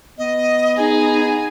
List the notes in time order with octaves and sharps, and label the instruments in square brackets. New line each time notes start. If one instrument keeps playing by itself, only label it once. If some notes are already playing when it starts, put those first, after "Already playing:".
[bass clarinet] B3 [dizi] D#5
[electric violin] D#4 G#4 [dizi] G#5